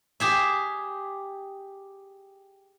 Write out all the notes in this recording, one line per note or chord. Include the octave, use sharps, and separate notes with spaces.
G4 G#4 E5